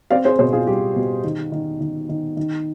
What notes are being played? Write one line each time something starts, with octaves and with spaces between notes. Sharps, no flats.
C4 D5 F5
G#4 C5
B2 G#4 C5
F4 G#4
G3 G4
B2
D#3
D#3
D#3
D#3
D#3